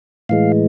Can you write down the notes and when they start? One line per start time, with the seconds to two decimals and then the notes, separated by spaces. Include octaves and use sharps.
0.29 A2 E3 G#3 F5